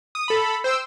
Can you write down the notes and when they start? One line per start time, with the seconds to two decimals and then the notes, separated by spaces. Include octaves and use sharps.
0.15 D#6
0.28 A4 B5
0.64 C5 G5 E6